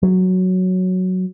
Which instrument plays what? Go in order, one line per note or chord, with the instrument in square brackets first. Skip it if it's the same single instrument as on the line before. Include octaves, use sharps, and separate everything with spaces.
[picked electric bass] F#3